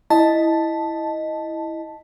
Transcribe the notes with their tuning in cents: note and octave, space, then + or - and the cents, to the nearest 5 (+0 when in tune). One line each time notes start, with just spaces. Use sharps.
E4 +0 D#5 +0 A5 +0